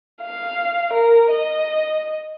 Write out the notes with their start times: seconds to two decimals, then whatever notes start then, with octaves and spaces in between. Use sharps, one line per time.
0.22 F5
0.92 A#4
1.30 D#5